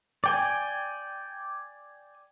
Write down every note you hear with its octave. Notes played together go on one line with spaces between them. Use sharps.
D5 G5 G#5